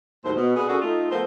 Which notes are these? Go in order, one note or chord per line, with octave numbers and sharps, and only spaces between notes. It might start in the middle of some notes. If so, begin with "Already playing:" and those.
D#2 A2 F#3 C5
B2
B2 B3 D4 G#4
A#3 C#4 D4 F#4 G#4 A4
A3 D#4 F4
F3 A3 B3 A#4 C5